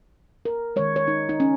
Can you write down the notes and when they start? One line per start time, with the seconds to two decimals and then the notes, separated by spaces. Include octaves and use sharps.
0.45 A#4
0.76 D#3 G#3 C#5
0.96 C#5
1.08 D#4
1.29 D#4
1.40 C#4